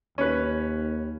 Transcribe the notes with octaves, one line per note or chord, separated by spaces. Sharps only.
D#2 C#4 B4